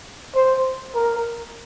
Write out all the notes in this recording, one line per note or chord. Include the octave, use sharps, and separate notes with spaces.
C5
A#4